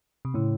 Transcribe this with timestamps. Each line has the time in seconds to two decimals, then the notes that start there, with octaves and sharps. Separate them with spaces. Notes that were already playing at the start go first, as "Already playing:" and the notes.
0.25 C3
0.34 A2 C#3